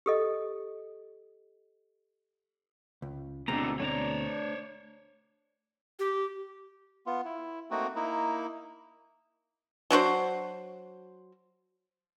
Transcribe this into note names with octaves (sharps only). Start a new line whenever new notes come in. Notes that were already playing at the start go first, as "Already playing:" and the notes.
G4 A4 D#5
C#2
D2 G#2 B2 D3 C4 A#5
A3 D4 C#5 D5 A#5
G4
B3 F4
E4
A3 A#3 C4 D#4 F#4
A#3 D#4 E4
F#3 D4 F#4 C5